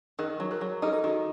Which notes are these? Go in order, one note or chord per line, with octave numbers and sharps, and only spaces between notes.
D#3 G#4 A#4
F#3
G#4 A#4
F#3
D#4 G4 A4
D#3 F#4 G#4